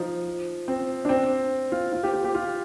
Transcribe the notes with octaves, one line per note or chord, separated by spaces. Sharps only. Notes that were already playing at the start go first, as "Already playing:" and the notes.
Already playing: F3 D#4
C4
D4
C4
F4
F4
G4
G4
G4
F4